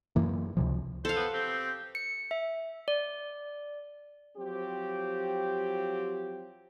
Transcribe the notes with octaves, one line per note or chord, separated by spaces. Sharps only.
F#2 E3 A#3
C#2 C3 F3
A4 C5 F5
B3
C4 G4
C#7
E5
D5
F3 F#3 C4 G4